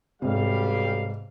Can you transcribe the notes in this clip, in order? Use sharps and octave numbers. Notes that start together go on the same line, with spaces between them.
B1 G#2 C3 G3 F5